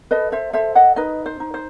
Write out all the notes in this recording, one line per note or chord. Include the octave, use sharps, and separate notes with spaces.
A4 B4 D#5
C5 E5
A4 C5 E5
D#5 F#5
D#4 B4 D#5
C5
D#4
C5